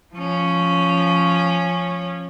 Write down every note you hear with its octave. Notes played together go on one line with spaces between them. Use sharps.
F3 C#4